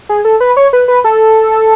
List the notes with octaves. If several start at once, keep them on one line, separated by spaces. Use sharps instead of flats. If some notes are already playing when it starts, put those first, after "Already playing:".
G#4
A4
B4
C#5
B4
B4
A4